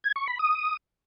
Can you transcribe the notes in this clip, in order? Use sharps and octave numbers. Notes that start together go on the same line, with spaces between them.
G#6
C#6
B5
D#6